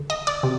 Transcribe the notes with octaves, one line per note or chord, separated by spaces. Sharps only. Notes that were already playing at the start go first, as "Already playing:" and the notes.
Already playing: D3
D#5
D5
C3